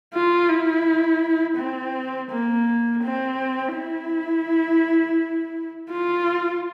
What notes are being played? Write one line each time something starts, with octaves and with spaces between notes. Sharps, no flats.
F4
E4
C4
A#3
C4
E4
F4